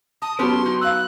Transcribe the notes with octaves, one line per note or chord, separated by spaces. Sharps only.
A5 D#6
F#3 B3 C#4 G4 A5 C6
D#4
F5 E6 F#6